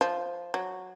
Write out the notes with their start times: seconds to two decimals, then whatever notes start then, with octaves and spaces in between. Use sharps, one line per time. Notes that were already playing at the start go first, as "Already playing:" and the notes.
0.01 F3
0.54 F#3